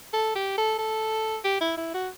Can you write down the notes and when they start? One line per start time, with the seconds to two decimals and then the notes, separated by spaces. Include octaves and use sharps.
0.14 A4
0.35 G4
0.58 A4
0.79 A4
1.45 G4
1.61 E4
1.78 E4
1.94 F#4